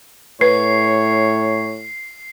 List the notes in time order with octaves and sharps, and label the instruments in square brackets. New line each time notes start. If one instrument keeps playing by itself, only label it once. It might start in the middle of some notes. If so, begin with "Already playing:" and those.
[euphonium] A2 [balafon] B4 [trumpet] C#5 [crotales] C7